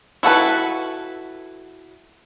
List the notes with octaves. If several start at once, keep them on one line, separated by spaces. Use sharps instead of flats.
E4 F#4 A4 B4